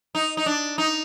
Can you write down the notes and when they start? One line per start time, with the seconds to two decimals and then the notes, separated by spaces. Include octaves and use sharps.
0.15 D#4
0.37 D#4
0.46 D4
0.78 D#4